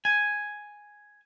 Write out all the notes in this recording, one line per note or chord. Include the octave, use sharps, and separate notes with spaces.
G#5